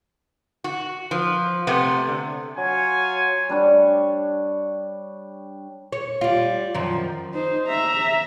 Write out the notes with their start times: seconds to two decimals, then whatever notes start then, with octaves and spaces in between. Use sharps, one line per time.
0.64 F#4
1.11 F3 B4
1.67 C3 A3 B3
2.08 D3
2.58 F#3 F4 C#5 G#5
3.49 G3 D4 C#5
5.92 C#5
6.21 G3 F4
6.74 F#2 D#3 F3
7.33 D#4 C5
7.68 E5 A#5